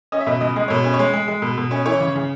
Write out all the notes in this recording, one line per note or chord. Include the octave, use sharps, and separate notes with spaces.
C#4 D#5
E5
B2 D#5
C#2 D#5
G#3 D#5
B2 C#5
C#4
C#5
G#3
G#3
G#3
B2
B2
C#4
E3 C#5
C#3
C#3